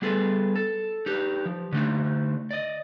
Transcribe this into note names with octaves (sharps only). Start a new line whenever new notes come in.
G3 B3 G#4 A4 B4
A4
D#4 G4 B4
F3
D3 A3 D#4
D5 D#5